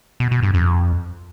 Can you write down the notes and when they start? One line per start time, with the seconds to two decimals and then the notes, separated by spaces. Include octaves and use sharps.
0.20 B2
0.31 B2
0.43 G2
0.54 F2